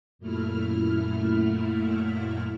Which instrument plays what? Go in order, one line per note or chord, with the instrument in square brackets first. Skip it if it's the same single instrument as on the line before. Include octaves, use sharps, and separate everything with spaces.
[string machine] F#2 A#2 A3 E4 F6